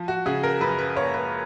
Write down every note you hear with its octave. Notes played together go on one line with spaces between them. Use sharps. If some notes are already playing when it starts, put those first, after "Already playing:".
Already playing: F3
F#4
C#3 G#4
A#4
F#2 B4
B4
A#3 C#5
B4